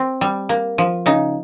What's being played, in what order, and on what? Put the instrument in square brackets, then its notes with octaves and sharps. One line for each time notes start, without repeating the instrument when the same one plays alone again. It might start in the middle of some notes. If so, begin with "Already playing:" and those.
Already playing: [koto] C4
G3
A#3
F3
C#3 D#4